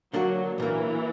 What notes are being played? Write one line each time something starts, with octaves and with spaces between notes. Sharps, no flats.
D3 F#3 A#3 D4 F#4
B1 A#2 E3 A#3